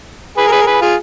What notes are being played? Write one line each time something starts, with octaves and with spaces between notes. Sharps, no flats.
G#4 B4
A#4
G#4 B4
A#4
G#4 B4
F4 G#4